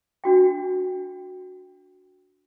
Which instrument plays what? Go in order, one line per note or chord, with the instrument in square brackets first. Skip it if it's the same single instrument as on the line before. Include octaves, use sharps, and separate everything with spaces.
[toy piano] D4 F#4 G5